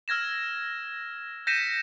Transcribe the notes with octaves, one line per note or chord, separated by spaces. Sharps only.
E6 F6 G#6 A#6 E7
G6 A#6 B6 C#7 D#7 E7